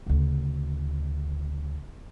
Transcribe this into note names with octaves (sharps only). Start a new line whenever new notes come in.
D2 C#3